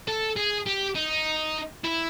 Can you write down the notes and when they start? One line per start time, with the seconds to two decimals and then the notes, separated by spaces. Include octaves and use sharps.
0.08 A4
0.37 G#4
0.67 G4
0.96 D#4
1.84 E4